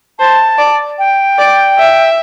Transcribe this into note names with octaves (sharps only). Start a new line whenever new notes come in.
C5 A5
D5
G5
D5
E5